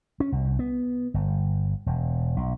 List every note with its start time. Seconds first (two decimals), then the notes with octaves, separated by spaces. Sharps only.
0.20 C#4
0.32 C2
0.59 B3
1.14 G1
1.86 E1
2.37 B1